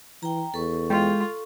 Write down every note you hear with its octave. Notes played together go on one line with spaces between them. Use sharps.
E3 G5 A#5
E2 A4 C#6
G#3 F4 G5